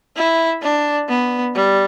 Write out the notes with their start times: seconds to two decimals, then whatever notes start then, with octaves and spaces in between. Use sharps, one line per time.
0.17 E4
0.63 D4
1.09 B3
1.55 G3